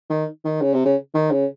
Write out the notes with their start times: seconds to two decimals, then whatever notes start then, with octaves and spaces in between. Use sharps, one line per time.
0.09 D#3
0.45 D#3
0.61 C#3
0.74 C3
0.85 C#3
1.14 D#3
1.31 C#3